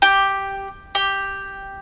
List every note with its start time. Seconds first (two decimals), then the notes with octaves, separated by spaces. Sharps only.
0.02 G4
0.95 G4